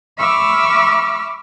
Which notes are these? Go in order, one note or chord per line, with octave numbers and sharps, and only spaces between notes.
E5 B5 C#6 D6 E6 F6